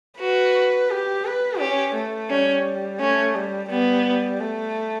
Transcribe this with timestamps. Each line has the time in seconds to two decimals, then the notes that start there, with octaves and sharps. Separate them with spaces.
0.20 F#4 B4
0.90 G4
1.25 B4
1.60 C#4 G4
1.95 A3
2.30 G3 C#4
2.99 A3 C#4
3.35 G3
3.69 G3 B3
4.40 A3